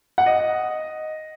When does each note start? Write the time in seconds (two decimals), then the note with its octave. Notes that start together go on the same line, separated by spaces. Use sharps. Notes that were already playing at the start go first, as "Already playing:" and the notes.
0.18 F#5
0.26 D#5